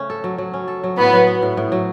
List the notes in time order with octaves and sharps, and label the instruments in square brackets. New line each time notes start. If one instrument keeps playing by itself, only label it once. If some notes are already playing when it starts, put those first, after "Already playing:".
Already playing: [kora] C#3 A3 C#4
A4
F#3
F#3
C#4
A4
F#3
[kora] A2 [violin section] B3
[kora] F#3
B3
A2
A2
F#3